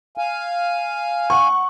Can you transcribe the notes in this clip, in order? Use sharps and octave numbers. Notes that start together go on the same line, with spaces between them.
F5 G#5
F#5 C#6